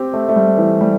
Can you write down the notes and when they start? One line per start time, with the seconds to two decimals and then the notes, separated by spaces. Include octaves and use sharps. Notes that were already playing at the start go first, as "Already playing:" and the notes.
Already playing: C4 G4
0.14 A3
0.29 A3
0.36 G3
0.57 E3
0.81 G3